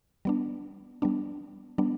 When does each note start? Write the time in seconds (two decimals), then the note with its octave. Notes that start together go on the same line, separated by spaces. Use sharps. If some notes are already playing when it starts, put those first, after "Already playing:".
0.25 G3 B3 D4
1.02 G3 B3 D4
1.78 G3 B3 D4